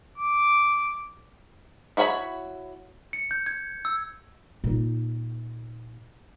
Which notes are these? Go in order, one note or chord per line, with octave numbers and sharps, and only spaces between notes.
D6
E4 F#4 C#5 G#5 B5
C#7
G6
G#6
E6
A#2 D#4